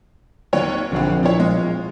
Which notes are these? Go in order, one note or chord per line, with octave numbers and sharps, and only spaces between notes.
D#2 F#3 C#5
A#1 D3 F#3 C4
F3 E4 C#5
G#3 F4